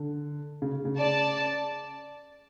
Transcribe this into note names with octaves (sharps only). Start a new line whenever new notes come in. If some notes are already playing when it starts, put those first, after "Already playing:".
Already playing: D3
C#3
C#3
D5 A5